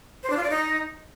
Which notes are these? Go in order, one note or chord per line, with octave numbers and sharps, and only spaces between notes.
C5
D4
F4
D5
D#4